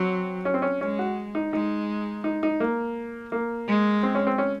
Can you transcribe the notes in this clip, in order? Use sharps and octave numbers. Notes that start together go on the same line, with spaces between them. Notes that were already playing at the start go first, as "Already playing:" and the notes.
Already playing: F#3 C4
C#4
C4
C#4
G#3 C#4
F#4
D#4
G#3 D#4
D#4
D#4
A#3
A#3
G#3
C4
C#4
C4
C#4